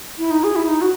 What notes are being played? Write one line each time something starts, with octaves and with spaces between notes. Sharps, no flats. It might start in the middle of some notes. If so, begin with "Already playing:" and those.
E4
D#4
G#4
E4
D#4
F#4